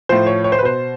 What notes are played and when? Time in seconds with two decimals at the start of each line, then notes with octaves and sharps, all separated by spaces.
0.09 A2 F3 C5
0.26 C#5
0.44 C#5
0.52 C5
0.59 B4
0.63 B2 C5